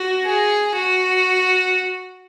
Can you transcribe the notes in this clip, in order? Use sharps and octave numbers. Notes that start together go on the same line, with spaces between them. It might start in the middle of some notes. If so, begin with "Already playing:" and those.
Already playing: F#4
G#4
F#4